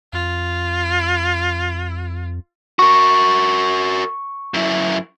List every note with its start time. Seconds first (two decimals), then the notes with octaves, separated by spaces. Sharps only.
0.13 F2 F4
2.79 F#4 A#4 C#6
4.54 F#2 E4